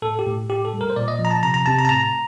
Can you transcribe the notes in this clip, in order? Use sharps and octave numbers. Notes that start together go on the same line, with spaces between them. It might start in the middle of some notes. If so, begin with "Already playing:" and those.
A2 A4
G4
A2
A2 G4
A4
G3
A#4
C5
A#2 D5
D#5
F3
A#5
A5
C3 A#5
A#5
C3 A5
A#5
A5
A2 A#5